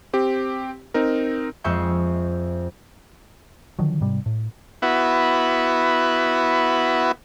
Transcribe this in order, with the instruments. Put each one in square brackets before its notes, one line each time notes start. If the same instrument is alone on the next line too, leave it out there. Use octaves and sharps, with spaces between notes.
[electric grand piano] C4 G4
C4 D#4 A#4
[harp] F2 G#3 F4 E5 C#6 G6
[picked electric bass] D3 D#3 F3 F#3
G#2 C3 G3
A2
[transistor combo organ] B3 E4 F#4